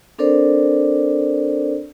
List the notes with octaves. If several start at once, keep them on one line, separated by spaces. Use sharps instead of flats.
C4 D4 A4 A#4 C5 D5